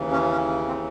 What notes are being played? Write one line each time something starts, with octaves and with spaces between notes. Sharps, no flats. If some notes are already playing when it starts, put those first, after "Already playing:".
Already playing: D#2 C#3 E3
C#4
C#4
C4